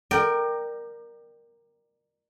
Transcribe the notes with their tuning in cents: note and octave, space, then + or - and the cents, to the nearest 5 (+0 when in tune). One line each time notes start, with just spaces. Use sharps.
A#4 +0 D5 +30 G5 +0